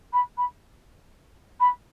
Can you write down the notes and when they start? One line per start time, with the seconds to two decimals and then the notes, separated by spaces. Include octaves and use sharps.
0.12 B5
0.37 B5
1.60 B5